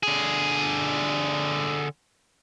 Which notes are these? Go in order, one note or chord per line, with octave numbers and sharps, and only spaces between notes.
D3 G#4